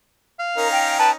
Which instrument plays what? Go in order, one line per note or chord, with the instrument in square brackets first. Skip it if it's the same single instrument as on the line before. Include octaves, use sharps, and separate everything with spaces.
[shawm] F5
[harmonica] C#4 D#4 A#5 [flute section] A#4
[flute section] G5
[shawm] B4 [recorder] A5